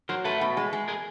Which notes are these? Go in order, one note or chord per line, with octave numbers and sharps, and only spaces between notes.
F#3 A#4 C5
A3 A4 B4
B2
G#3
G#3
G#4 A#4